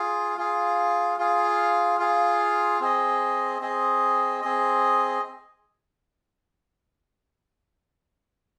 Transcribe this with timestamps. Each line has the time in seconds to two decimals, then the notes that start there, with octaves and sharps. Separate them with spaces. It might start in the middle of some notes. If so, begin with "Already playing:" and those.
Already playing: F4 G#4 F5
0.38 F4 G#4 F5
1.18 F4 G#4 F5
1.99 F4 G#4 F5
2.81 C4 G#4 D#5
3.61 C4 G#4 D#5
4.41 C4 G#4 D#5